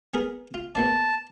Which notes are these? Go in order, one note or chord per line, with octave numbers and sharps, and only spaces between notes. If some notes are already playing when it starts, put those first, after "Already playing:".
B3 G#4 A#4
F4
E2 A#3 D5 A5